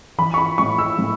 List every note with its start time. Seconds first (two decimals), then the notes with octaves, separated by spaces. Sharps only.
0.18 E3 B5
0.34 C#6
0.38 B5
0.58 A2 C#6
0.78 E6
0.99 A2